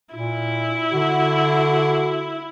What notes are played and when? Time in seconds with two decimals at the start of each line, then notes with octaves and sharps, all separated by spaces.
0.14 A#2 E4
0.93 D3 F#4